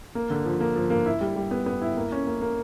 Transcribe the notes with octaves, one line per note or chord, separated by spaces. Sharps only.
A#3
D3
F3
A#3
F3
A#3
E4
G3
G3
B3
B3
E4
A#3
C#4
A#3
A#3